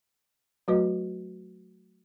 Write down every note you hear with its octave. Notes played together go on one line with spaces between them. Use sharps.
F#3 A3 F#4 B4 D#5